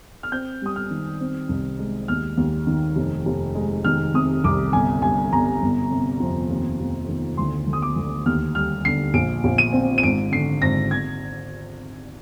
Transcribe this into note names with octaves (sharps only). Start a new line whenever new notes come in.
F6
C4 G6
G3 D#6
F6
D#3
C4
C2
G#3
D#2 F6
D#2
D#3
F1
F1
G#3
D#3 F6
C3 D#6
C2 D6
G1 G#5
G2 G#5
G1 A#5
G1
C3
F2
D#2
F1
D#3
D2 C6
D2
D#6
D6
D2
D#2 F6
G3 F6
D3 C7
A#1 D7
A#1
D#7
C4
D#7
G#1 D7
D3 C7
G#1 A#6
G#6